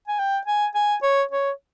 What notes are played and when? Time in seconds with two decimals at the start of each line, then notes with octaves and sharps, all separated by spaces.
0.08 G#5
0.19 G5
0.46 G#5
0.75 G#5
1.03 C#5
1.31 C#5